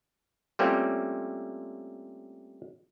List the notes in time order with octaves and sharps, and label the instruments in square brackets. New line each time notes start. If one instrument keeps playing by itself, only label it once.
[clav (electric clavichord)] G3 A3 A#3 C4 C#4 F4